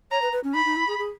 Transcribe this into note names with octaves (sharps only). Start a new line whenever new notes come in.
C#5 A#5
B4
B4
C#4
D#4 B5
D#4
E4
G#4
G#4